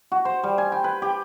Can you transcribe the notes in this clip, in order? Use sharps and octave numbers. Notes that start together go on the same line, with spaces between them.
F#4
C5
G3
G#5
G5
B4
G4